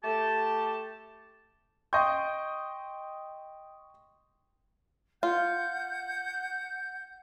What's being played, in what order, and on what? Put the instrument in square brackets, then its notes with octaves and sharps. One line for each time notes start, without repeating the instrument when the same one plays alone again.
[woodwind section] A3 G4 A5
[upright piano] D#5 G6 [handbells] G5 C6 C#6
[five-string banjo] F4 [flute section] F#5 G6